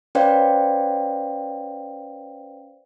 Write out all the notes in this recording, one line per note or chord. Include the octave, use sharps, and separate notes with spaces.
C#4 B4 C5 D5 F5 G5